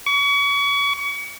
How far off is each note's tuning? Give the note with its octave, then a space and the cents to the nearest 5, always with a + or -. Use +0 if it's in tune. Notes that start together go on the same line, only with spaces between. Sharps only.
C#6 +35